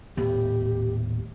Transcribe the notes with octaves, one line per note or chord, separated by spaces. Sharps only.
D#1 A2 B3 G4